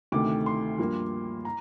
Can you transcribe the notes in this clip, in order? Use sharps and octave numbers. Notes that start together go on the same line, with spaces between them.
D2 C3 D#3 A3 D6
C6
G2 F3 A#3
A#5